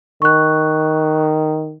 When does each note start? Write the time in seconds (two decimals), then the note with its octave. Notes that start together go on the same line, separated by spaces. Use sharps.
0.22 D#3 C#6 F#6